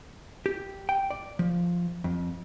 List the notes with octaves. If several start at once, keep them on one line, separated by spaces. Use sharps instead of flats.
G4
G5
D5
F3
F2